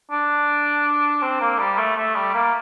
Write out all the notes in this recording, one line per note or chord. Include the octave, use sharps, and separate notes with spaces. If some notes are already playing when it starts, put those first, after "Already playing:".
D4
C4
A#3
G3
A3
A3
G3
A#3